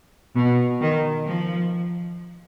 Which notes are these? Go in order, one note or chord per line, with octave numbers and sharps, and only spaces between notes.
B2
D#3
F3